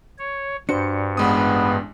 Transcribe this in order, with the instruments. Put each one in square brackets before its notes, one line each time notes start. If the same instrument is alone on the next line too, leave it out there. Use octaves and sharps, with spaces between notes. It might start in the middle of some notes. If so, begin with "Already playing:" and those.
[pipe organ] C#5
[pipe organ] G2 [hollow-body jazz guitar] D4 F#4 C5 [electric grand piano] C#7
[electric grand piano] A1 G#3 D#6 [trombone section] B3